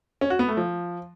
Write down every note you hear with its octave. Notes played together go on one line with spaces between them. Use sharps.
C#4
F#4
B3
A3
F3